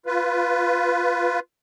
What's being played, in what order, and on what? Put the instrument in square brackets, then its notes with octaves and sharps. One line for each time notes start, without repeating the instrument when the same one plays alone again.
[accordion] F4 B4